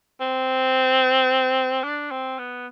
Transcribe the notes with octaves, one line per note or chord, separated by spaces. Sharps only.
C4
D4
C4
B3